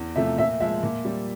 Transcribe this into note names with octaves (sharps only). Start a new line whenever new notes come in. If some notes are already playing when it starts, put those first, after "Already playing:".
Already playing: E2
C3 F3 A3 E5
A#2 E5
F3 G#3 E5
A#2
G3